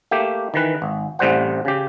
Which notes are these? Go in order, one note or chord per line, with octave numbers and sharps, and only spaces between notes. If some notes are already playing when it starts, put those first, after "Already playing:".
A3 A#3 G4
D#3 E3 B4
G#1
A1 A2 C3 G3 C5 F#5
C#3 G4